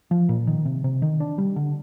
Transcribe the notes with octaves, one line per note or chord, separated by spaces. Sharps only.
F3
A#2
D#3
C3
C3
D#3
D4
G3
D3